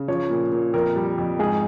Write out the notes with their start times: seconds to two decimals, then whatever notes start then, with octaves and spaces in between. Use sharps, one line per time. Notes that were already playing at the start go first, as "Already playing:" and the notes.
Already playing: C#3
0.08 F3 C#5
0.30 A#2
0.52 A#2
0.74 F2 A#4
0.96 G3
1.18 F2
1.39 G#2 G#4